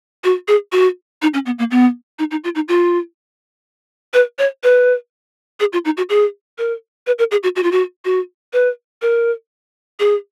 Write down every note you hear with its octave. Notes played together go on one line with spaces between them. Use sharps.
F#4
G#4
F#4
D#4
C#4
B3
A#3
B3
D#4
D#4
F4
D#4
F4
B4
C#5
B4
G#4
F4
D#4
F#4
G#4
A#4
B4
A#4
G#4
F#4
F#4
F4
F#4
F#4
B4
A#4
G#4